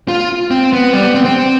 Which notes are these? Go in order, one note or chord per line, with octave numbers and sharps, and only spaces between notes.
F4
C4
B3
G3
B3
C4
C4